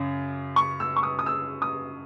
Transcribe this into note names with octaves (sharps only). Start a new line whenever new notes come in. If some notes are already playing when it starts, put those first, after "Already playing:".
Already playing: F#2 C#3
C#6
E6
C#6
D#6
D#6
E6
D#6